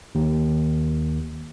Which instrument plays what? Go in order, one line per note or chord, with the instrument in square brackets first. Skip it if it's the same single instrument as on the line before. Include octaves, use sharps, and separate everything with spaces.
[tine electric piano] D#2